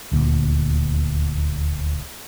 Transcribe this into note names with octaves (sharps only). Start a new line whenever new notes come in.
D#1 D2 A#2